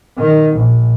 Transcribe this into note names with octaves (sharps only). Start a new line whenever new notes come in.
D#3
A#1